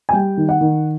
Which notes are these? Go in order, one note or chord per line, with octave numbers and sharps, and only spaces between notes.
G#5
G3 G5
D#3
F#5
D#3